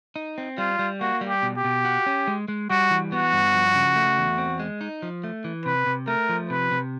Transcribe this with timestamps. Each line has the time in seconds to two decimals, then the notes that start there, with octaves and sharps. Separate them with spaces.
0.16 D#4
0.38 C4
0.58 G3 F4
0.79 G3
1.01 A#3 F#4
1.21 G3
1.28 G4
1.42 B2
1.57 G4
1.65 B2
1.85 F#4
2.06 C#4
2.27 G#3
2.48 G#3
2.70 G3 F#4
2.91 E3
3.12 B3 F#4
3.33 G2
3.54 F3
3.75 C#3
3.96 A3
4.18 E2
4.38 C4
4.59 G#3
4.81 D#4
5.02 F3
5.24 A3
5.44 E3
5.65 C3 B4
5.86 C3
6.07 A3 A#4
6.29 F3
6.50 C3 B4
6.71 C3